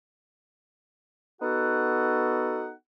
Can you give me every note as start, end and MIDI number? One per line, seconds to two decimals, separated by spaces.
1.42 2.72 59
1.42 2.72 63
1.42 2.72 66
1.42 2.72 69
1.42 2.72 78